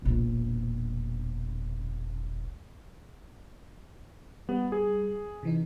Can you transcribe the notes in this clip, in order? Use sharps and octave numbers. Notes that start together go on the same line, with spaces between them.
E1 A#1
G3 B3
G#4
C3 E3 D#4